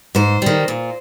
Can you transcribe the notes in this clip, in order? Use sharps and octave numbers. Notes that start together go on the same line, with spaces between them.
G#2 C5
D#3 G3
A#2